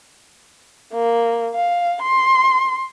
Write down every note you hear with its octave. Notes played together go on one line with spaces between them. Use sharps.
A#3
F5
C6